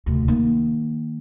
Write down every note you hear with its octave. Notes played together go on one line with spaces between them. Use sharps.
D2 C3
D#3 A#3